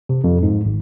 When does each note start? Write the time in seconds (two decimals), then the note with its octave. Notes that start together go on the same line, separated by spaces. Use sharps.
0.09 C3
0.24 F2
0.43 G#2
0.65 G#1